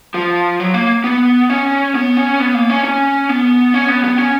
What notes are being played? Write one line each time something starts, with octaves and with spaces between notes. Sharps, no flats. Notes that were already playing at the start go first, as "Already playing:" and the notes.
F3
F#3
A#3
B3
C#4
B3
C#4
B3
A#3
C#4
C#4
B3
C#4
B3
B3
C#4